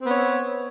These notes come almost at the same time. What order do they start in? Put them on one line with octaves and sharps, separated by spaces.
C4 B3 C#5